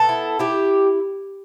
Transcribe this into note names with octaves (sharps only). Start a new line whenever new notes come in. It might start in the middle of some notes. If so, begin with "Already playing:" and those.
Already playing: B3 A4
E4
E4 G4